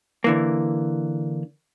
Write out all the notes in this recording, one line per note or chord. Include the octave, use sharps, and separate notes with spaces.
D3 E3 A#3